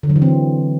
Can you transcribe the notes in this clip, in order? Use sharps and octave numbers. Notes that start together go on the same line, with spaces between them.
D3
F#3
E3
C4